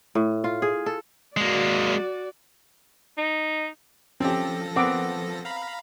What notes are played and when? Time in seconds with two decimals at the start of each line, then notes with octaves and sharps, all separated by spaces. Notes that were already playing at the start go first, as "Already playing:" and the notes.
0.15 A2
0.44 F4
0.62 G#4
0.86 A4
1.37 G#3 A#3 F#4 D5
3.18 D#4
4.20 F3 C4 C#4 G4 A4 A#6
4.76 B3 C4 A#4 F#5 D6
5.45 F5 A#5 B5